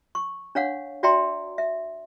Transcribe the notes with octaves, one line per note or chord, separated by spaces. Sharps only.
C#6
D4 C#5 F5 F#5
F#4 D5 E5 G5 A#5 C6
E5